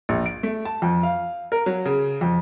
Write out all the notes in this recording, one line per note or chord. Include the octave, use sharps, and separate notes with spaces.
A#1
D7
A3
A5
F2
F5
A#4
F#3
C#3
F2